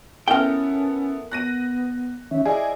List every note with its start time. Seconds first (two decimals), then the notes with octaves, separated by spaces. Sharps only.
0.28 B3 C#4 E4 A4 A#4 G5
1.32 B3 F#6 A#6 D#7
2.31 D#3 C#4 E5
2.46 E4 G#4 D5 D#5 G#5